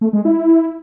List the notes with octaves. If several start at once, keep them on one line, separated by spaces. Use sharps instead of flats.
A3
G#3
E4